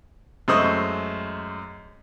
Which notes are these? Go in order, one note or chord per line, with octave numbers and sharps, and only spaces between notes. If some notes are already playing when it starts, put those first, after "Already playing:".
F#2 G#3 A3 C5 C#6 D#6